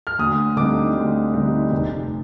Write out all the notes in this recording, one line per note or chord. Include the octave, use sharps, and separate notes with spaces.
F6
D2 D#6
D3 G3 C4 D#4 D6
D2
D3 G3 C4 D#4
F1